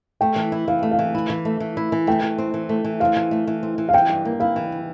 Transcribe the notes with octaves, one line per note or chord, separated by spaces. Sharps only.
A3 G5
E3
E4
E3 F5
A3
F5
E3
E4
E3
A3
E3
E4
E3
A3 G5
E3
C4
E3
A3
E3
C4 F5
E3
A3
E3
C4
E3
F5
E3 G5
G2
A#3
E4 F5
E3